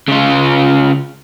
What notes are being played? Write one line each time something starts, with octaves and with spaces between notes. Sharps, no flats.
C#3 F4